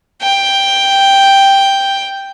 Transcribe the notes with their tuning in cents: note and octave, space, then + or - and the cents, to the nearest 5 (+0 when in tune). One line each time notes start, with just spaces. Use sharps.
G5 +5